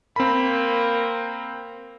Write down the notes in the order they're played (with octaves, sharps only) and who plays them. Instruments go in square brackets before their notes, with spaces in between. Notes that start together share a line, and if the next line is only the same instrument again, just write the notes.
[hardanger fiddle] A#3 [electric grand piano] C4 B5